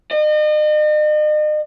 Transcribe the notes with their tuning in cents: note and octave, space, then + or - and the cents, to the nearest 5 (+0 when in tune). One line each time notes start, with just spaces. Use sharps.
D#5 -40